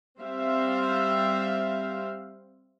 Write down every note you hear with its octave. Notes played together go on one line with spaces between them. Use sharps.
G3 C4 C5 E5 F5